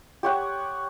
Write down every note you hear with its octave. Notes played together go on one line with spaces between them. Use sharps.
G4 C#5 F#5